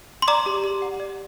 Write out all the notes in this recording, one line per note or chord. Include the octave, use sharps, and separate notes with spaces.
C6
D5 A#5 D6
G4
G4
F#5
D5